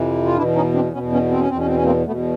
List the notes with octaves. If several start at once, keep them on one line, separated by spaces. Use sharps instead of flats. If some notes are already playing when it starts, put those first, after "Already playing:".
Already playing: F2 C3 E3
F4
E2 B2 D4 E4
C#4 D#4
C4 D4
E2 B2 B3 C#4
B3 C#4
C4
C#4
E2 B2 C4
C#4
C4
C#4
A#3 C4
E2 B2 A3 B3